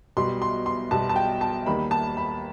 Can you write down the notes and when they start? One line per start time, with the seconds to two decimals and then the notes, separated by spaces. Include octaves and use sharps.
0.17 B1 B2 G3 C6
0.42 C6
0.66 C6
0.91 B1 B2 G3 A5
1.09 A5
1.16 G5
1.41 A5
1.66 D#2 D#3 G3 B5
1.91 A5
2.17 B5